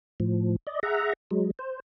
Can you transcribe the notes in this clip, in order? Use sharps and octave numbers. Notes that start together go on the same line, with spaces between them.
A2 F3
D5 D#5
G#4 E5 F#5 A#5
F#3 G#3
C5